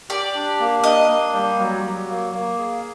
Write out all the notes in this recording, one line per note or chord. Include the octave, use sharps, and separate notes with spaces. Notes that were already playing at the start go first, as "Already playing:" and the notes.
G4 D5
D4
A#3
D4 D#5
A#3
G3
F#3
F#3
A#3
A#3
G#4